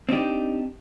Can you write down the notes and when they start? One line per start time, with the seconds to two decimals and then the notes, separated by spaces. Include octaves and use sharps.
0.09 C4 D4 D#4 G4